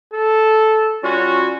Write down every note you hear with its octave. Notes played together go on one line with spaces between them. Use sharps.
A4
G3 C#4 F4 F#4